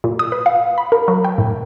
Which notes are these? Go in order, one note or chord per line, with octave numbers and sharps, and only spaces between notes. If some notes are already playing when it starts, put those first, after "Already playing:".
A#2
D#6
B4
F5
B5
A#4
F#3
G5
A2